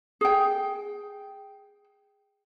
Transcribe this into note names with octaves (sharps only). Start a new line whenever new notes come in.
G#4 G5